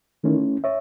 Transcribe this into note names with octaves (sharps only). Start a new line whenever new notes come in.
D#3 A3 C#4 E4
C#5 E5